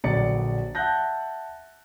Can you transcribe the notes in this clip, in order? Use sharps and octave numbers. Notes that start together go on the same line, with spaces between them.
A#1 D3 F#3 D5 A6 C#7
E5 F#5 A5 F#6 G6 A#6